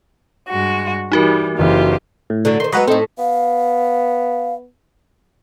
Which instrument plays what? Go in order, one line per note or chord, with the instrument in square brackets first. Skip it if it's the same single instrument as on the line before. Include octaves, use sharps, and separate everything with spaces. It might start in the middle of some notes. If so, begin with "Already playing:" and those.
[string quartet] G2 G#3 F#4
[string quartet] E3 G3 [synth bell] D#4 F#4 A#4
[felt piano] F#1 E3 [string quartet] F4 G4 C5
[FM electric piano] A2
[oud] D3 F#3 D4
[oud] D#3 C5 [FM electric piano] C6
[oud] F#3 G#3 B3 [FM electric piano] F#4 B4 D#5
[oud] A2 A4 [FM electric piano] C4 D#4
[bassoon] B3 [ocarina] F5